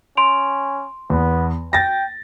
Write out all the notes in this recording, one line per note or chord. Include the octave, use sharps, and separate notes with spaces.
C#4 C6 D7 F7
E2 B3
G5 A6 A#6